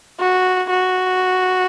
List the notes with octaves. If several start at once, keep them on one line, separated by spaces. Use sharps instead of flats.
F#4
F#4